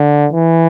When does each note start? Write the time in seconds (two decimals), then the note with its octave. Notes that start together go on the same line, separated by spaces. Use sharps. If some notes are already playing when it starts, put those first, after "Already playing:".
Already playing: D3
0.33 E3